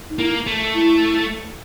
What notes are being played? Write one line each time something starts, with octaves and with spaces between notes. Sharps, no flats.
D#4
A#3 E4
A3
E4